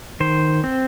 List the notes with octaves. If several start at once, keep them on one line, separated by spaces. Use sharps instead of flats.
D#3 C5
C4